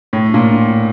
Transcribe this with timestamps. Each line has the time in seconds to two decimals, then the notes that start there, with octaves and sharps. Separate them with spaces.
0.13 A2
0.34 A#2